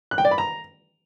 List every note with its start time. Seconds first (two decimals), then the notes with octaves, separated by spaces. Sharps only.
0.11 F#6
0.18 G5
0.25 D5
0.31 B5
0.38 A#5